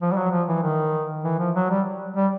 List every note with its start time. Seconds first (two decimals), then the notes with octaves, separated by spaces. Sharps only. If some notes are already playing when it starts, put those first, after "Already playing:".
0.02 F3
0.12 G3
0.17 F#3
0.32 F3
0.48 E3
0.63 D#3
1.24 E3
1.39 F3
1.55 F#3
1.70 G3
2.16 G3